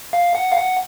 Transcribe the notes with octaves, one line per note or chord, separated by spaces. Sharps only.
F5
F#5
F5
F#5